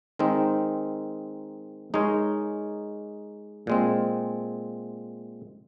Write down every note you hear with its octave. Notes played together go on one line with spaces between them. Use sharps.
D#3 G#3 C4 D#4 A#4
G#3 D#4 A#4 C#5
A#2 G#3 C4